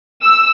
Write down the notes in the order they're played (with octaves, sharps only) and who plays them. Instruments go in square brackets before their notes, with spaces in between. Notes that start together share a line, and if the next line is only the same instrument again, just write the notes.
[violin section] E6